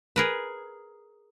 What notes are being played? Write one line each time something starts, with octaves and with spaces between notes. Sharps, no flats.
G#4 A#4 B4